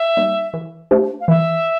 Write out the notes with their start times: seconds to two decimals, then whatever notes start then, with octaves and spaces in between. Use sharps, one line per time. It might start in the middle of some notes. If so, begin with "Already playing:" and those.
Already playing: E5
0.17 G3 A#3 D#4
0.54 E3
0.91 A3 D4 G4 C5
1.21 F5
1.28 E3 E5